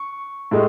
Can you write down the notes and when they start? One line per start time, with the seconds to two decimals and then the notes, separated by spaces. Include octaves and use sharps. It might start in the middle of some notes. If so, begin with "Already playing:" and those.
Already playing: C#6
0.51 A2 G#3